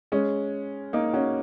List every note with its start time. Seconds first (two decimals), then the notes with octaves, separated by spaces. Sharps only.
0.12 G#3 C#4
0.93 A#3 D#4
1.13 C#4 F#4